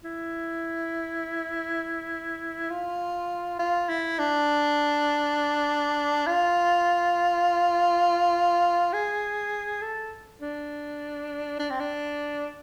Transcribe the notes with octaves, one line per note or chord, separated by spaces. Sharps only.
E4
F4
F4
E4
D4
F4
G#4
A4
D4
D4
C4
D4